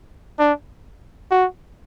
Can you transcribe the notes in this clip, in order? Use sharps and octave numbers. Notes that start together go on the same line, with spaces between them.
D4
F#4